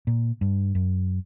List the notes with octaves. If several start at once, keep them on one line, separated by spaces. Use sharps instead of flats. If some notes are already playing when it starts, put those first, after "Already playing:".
A#2
G2
F#2